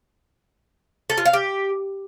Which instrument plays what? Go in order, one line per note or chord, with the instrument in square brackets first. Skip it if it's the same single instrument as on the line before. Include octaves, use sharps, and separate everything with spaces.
[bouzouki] A4
F4
F5
G4